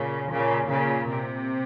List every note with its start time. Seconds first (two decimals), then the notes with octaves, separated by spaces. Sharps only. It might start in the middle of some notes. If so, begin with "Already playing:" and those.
Already playing: A#2 C#3
0.30 A#2 C#3
0.70 A#2 C#3
1.10 C3